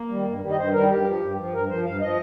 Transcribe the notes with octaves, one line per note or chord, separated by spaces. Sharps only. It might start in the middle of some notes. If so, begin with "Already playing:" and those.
Already playing: A#3
D#3 G3
G2
D#3 G3
D#5
G2 C5
D#3 G3 A#4
G2 G4
F3
G2
F3
G2 A#4
F3 C5
G2 F5
F3 D#5